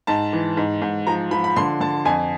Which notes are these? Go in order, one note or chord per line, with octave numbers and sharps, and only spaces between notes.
G#2 A5
E3
G#2
G#2
F3 A#5
F3 B5
B5
D3 C6
D3 A5
F2 G#5